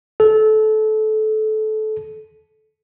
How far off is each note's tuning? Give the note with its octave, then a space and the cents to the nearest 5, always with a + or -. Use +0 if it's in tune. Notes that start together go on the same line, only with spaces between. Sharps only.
A4 -25